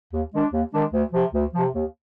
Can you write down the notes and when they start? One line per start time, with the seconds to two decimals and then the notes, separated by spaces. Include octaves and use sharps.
0.13 D#2
0.33 D#3 G#3 D4
0.53 D#2
0.73 D#3 G#3 D4
0.93 D2
1.13 C3 F3
1.34 D2
1.54 C3 F3
1.74 D#2